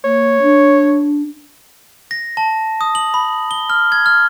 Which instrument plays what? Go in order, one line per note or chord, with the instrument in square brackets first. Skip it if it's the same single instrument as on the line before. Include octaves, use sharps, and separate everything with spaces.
[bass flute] A#3 [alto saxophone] C#5
[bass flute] D4
[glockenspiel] A#6
A5
D#6
F#7
B5
G7
F6
G#6
F6